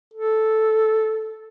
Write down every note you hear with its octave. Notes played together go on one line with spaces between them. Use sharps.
A4